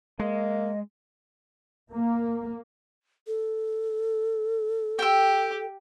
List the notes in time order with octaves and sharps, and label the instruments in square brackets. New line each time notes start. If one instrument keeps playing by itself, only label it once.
[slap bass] G#3 [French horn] A#3 [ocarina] D#5
[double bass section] A#3
[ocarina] A4
[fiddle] G4 [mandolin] G5 E6